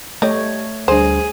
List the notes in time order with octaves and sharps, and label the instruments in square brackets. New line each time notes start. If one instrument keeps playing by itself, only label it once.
[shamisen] G3 D#5 [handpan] A3 C#5
[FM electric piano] D2 G3 D4 [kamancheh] G#4 [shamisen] C5